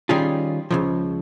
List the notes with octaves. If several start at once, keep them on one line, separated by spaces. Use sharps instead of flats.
D#3 G3 C#4 F4 G#4
C#2 C#3 F3